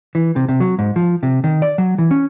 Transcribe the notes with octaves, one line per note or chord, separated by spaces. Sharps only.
E3
C3
C3
F#3
G#2
F3
C3
D#3
D5
F#3
E3
C#4